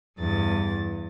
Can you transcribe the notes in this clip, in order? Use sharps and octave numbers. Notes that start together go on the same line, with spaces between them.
E2 G2 A6